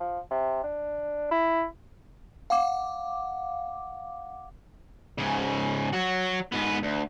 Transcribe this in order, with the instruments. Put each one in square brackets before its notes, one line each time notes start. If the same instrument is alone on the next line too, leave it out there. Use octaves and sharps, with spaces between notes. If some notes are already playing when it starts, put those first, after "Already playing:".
[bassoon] F3
C3
D4
E4
[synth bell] F5 F#5 D6
[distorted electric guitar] G#2 C#3
F#3 F#4
G#2 B3
D2